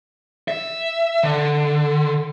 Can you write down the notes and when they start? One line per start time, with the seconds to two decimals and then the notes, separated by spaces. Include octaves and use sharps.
0.48 E5
1.23 D3